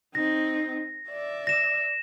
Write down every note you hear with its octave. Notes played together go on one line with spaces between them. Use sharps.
C4 D#4 A#6
D5 E5
A#6 E7